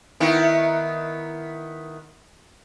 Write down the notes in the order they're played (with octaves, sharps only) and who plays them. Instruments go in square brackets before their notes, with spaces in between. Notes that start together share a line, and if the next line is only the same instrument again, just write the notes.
[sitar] D#3 B3 E4